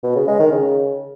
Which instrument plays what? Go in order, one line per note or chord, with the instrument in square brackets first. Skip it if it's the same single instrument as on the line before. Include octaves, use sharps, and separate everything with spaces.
[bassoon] B2
C#3
G#3
D#3
C#3